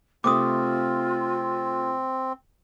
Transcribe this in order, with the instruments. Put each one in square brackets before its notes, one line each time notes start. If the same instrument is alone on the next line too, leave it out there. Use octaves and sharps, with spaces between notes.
[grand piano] C3 A3 [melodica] C4 [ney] F4 [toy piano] D6 D#6